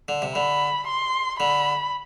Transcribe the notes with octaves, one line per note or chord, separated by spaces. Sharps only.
D3
C3
D3 B5
C6
D3 B5